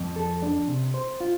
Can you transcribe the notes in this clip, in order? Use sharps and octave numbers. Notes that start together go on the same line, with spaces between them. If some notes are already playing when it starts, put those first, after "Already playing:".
Already playing: F2
A4
D4
C3
C5
F4